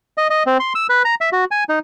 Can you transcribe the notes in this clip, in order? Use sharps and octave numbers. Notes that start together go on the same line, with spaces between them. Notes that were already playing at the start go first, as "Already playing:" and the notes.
D#5
D#5
C4
C6
E6
B4
A#5
E5
F#4
G#5
D#4